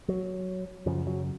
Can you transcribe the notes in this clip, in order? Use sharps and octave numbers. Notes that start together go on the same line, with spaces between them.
F#3
F#2 C#3 F3
F#3